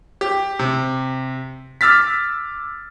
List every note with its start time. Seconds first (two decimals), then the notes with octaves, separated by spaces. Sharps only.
0.21 G4
0.59 C3
1.81 D6 E6 F6 A6 B6